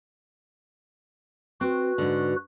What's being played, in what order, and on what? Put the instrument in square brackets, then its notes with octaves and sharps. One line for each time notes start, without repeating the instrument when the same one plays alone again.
[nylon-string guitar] C4 [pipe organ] F#4 B4
[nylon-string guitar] G#2 D3